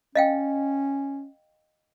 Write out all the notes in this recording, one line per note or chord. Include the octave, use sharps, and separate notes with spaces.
C#4 D#5 F5 G5